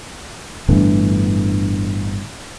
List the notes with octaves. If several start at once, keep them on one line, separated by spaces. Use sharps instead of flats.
G1 A2 D3 E3